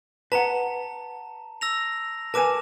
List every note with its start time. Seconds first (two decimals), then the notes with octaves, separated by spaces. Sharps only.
0.32 B4 F#5 A5 A#5
1.61 E6 A#6 F7
2.34 A#4 B4 G#5 A5 D6 E7